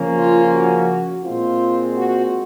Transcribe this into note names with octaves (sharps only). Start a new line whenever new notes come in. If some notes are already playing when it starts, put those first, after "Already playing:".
Already playing: C#3 F3 A#3 C#4
F4
F#4
A#2 G#3 C4 F4
F#4